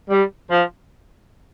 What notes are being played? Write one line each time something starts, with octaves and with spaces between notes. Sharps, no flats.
G3
F3